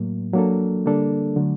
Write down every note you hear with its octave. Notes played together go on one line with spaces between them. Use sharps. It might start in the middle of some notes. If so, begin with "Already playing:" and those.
Already playing: A2 F#3 A#3
F#3 A#3 D4 A4
D3 G3 A#3 D4 A4
D3 F#3 A3